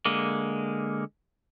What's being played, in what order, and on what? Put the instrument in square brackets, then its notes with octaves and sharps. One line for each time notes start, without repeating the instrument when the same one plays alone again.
[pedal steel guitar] D3 G#3 A#3